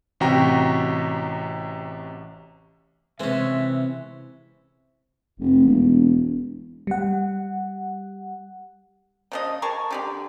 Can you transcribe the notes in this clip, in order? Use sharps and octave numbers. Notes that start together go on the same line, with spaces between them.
A1 C3 F#4 G5 A#5
C3 E3 G#3 C4 C#4 E5
F1
E1
G3 F#5
C#3 F3 D#5
G#4 A#4 A5 C#6
D3 G4 D5